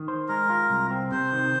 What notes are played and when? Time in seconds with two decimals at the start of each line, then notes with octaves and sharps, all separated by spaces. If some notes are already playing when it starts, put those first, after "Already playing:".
Already playing: D#3
0.08 C5
0.29 G#3 A#4
0.49 F4
0.70 C2
0.91 C4
1.11 C3 C5
1.32 D#3